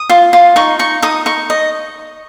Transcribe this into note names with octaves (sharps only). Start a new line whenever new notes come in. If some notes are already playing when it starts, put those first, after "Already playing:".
Already playing: D#6
F4
F4
D#4 C#6
D#4 C#6
D#4 D#6
D#4 C#6
D#5